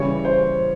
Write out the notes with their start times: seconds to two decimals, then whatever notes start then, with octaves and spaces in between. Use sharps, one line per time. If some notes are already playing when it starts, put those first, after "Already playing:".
Already playing: C#3 E3 G3 C#5
0.25 C5